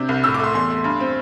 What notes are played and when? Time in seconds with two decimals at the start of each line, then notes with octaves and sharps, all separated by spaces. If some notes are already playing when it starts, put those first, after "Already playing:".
Already playing: C3 D4 G6
0.09 C2
0.24 A2 E6
0.34 D6
0.39 A3 C6
0.54 E2 C6
0.70 A3
0.84 G2
1.00 C4